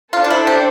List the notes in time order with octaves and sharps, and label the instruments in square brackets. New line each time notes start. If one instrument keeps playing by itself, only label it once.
[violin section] D4 A4 C5 [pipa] F4
[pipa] F4
E4
G4